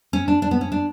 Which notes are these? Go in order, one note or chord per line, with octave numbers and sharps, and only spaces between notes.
C#4
D4
D4
B3
C#4
D4